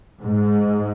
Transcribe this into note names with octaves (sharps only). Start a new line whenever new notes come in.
G#2